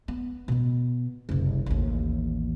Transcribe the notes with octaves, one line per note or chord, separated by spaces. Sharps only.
B3
B2 B3
F#1 C2
A1 D#2